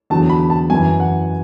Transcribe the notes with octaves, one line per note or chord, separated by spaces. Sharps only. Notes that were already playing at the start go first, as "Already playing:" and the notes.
E2 D3 F#3 A5
B5
A5
F#2 E3 G#5
F#5